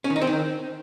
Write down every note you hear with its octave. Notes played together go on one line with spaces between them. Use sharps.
C#4
D#3
D#4
C4
D#3